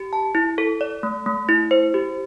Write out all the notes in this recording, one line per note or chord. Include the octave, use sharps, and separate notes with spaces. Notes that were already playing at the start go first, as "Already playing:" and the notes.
Already playing: G4
A5
E4
A4
D5
A3
A3
E4
C5
G4